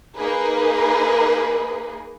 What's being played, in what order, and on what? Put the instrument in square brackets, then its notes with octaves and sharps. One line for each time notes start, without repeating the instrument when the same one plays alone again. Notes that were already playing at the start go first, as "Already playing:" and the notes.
[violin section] A#3 D#4 G#4 A#4 B4